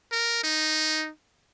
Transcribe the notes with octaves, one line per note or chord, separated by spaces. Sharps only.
A#4
D#4